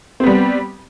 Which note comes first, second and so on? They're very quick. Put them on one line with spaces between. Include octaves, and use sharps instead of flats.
C4 B3 G3